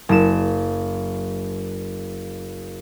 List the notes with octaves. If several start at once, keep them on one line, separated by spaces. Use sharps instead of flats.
F#1 E7